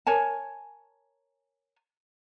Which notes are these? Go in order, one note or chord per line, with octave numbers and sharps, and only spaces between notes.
A#4 C#5 G#5 A5